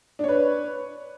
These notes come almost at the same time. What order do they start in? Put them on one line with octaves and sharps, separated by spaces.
D4 C#5 B4